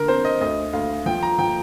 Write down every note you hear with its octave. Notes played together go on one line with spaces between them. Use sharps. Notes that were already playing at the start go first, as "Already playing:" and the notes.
Already playing: D3 A#4
C4 C5
D#5
D2 D#5
D2 F5
F3 G5
A#5
F3 G5